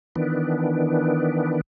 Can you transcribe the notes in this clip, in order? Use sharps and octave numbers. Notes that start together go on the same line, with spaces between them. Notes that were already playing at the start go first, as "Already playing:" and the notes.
D#3 E3 B3 D4